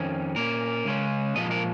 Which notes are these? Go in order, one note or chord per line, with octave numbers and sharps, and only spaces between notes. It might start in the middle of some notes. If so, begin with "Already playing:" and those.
Already playing: F2 D#3 C#4
A#2 A#3 C#4 A#4
C#2 C#3 G#3 C#4
A#2 F3 G#3 D#5
A#4